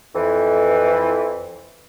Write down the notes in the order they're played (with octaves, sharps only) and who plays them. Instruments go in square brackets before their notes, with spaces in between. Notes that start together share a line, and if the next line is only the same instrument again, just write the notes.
[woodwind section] F2 E3